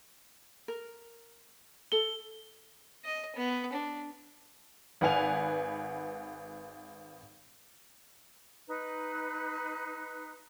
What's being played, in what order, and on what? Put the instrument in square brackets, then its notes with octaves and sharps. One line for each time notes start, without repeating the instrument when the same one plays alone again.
[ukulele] A#4
[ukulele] A4 A5 [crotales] G7
[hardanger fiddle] D#5
B3
D4
[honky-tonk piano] G#1 B4 F#5 G#5 F7
[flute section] D#4 B4